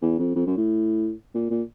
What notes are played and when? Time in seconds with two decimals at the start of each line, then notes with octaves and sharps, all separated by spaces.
0.02 E2
0.19 F2
0.35 F2
0.47 F#2
0.57 A2
1.34 A#2
1.51 A#2